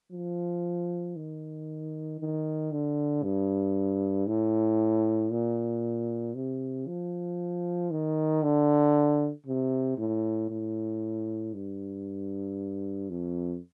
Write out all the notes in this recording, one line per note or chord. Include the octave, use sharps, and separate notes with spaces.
F3
D#3
D#3
D3
G2
A2
A#2
C3
F3
D#3
D3
C3
A2
A2
G2
F2